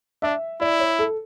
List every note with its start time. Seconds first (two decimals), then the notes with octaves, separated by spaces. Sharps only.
0.22 D4 E5
0.61 E4 D5
0.80 C#5
0.99 A4